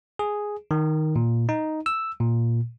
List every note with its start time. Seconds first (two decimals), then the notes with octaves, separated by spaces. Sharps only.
0.19 G#4
0.71 D#3
1.16 A#2
1.49 D#4
1.86 E6
2.20 A#2